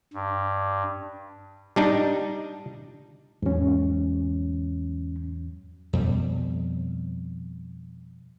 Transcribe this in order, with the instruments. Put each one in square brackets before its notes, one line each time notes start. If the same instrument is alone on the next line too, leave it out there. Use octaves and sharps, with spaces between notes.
[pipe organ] G2
[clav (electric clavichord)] G3 D4 D#4
[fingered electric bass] E2 F#3 [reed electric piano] G#2 C#4
[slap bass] F2 B2 G3